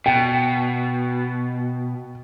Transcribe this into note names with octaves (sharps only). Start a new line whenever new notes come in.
B2 G5